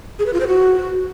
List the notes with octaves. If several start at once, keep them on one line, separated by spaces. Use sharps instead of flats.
G#4
B4
F4
C5
F#4